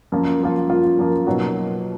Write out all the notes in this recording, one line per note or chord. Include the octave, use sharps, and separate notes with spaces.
F#2 F3 A#3 F4
F#2 F3 A#3 F4
F#2 F3 A#3 F4
F#2 F3 A#3 F4
B2 F#3 A#3 D#4 F#4